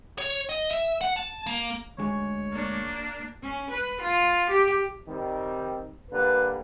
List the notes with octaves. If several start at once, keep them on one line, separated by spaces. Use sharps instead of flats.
C#5
D#5
E5
F#5
A5
A#3
D2 D3 G#3 C#5
A#3 D4
C#4
B4
F4
G4
D#3 G3 C4
D3 G3 A#3 B4